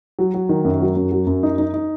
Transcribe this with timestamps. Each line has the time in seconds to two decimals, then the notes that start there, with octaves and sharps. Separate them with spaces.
0.19 F#3
0.34 F#3
0.49 D#3
0.65 F#2
0.80 F#3
0.96 F#2
1.11 F#3
1.27 F#2
1.43 D#4
1.58 D#4
1.74 D#4